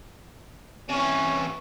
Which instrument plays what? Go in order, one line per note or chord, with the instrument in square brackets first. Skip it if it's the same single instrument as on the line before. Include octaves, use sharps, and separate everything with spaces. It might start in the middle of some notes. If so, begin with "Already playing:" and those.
[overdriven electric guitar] C3 E3 [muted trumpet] C#4